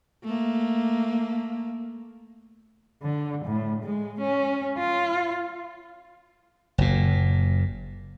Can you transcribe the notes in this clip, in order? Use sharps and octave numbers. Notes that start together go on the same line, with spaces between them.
A3 A#3
D3
A2
G#3
C#4
F4
F#1 A#2